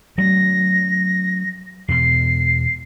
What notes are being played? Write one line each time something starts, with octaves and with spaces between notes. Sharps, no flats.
F#3 A3 C#4 A#6
E2 B2 C7